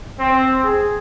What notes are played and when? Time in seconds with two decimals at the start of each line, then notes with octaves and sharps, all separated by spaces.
0.19 C4
0.62 G#4